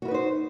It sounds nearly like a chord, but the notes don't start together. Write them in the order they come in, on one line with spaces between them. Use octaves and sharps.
F#4 E4 B4 D#4 C5